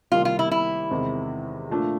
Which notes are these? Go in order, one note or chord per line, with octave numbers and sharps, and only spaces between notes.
C2 C3 D#3 G3 A#3 F4
F4
E4
E4
E2 C3 D#3 G#3 C4
A#2 F3 A3 D4